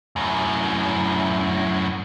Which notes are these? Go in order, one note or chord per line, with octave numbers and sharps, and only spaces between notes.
F#2 A2